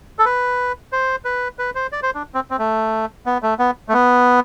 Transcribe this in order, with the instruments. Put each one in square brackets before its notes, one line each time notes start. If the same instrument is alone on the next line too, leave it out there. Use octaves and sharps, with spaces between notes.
[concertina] A4
B4
C5
B4
B4
C5
D5
C5
D4
C4
C4
A3
B3
A3
B3
A3
B3